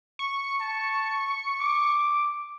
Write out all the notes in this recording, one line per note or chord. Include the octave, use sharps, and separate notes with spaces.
C#6
A5
D6